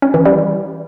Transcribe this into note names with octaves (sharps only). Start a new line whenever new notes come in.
C#4
E3
G3